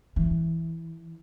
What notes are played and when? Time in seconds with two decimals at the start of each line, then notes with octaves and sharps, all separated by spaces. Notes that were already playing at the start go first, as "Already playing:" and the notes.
0.16 E3